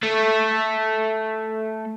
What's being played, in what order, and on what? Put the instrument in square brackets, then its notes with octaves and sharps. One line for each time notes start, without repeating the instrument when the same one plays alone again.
[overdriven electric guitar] A3 A4